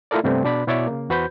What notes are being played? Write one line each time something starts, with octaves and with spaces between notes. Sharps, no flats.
A3 E4 F4 A4 A#4 D5
G2 C3 G3 A3 B3 C4
B2 D4 D5 B5
B2 E4 C#5 D5 E5 D6
C#3 A#3
E2 F#4 B4 C5 B5 G6